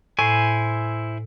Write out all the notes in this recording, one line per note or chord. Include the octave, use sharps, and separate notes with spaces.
A2 E4 C5 G#5